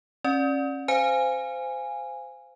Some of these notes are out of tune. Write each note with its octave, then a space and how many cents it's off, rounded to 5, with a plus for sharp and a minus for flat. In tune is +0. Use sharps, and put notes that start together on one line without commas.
C#4 -30 D5 +0
C5 -20 F5 +0 G#5 -10